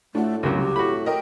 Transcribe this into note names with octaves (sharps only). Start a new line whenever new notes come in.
A2 A3 D4 F4 F#4
C#2 F#2 C3 F#3 A#3 G4
C2 G4
A2 F#4 B5
A3 A#4 D#5 G5